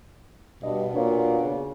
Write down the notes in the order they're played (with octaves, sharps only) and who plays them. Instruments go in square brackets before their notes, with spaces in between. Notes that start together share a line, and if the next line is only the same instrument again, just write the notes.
[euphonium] G2 [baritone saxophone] B2 [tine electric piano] D#5
[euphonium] A#2 [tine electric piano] D4 C#5 F5
[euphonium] C#3